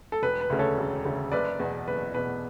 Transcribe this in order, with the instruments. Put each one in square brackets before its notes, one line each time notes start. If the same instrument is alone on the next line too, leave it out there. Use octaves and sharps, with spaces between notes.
[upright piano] A4
E1 B4
B4
D2 C#3
A4 C#5
E1
D2 C#3
F#1 B4 D5
E2 B2
F#1 B4
E2 B2 B4